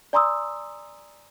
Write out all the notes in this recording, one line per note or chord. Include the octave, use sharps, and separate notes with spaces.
D5 G#5 A#5 C6 D#6 E6